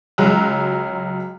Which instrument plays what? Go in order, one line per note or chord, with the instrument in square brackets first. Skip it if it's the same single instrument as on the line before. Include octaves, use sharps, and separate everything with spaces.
[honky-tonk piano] C#2 F#3 G#3 A#5 E6 F#6